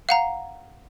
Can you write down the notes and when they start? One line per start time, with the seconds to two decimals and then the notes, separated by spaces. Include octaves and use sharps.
0.09 F5 F#5 A#5